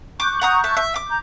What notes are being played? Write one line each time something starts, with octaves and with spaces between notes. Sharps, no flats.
C#6 D6 F#6 G6
F#5 A#5 D#6
E5 A5
E5
D6
A#5 G6